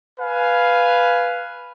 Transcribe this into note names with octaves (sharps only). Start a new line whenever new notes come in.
B4 F5 G#5